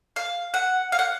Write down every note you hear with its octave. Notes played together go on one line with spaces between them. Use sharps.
F5
F#5
F5
F#5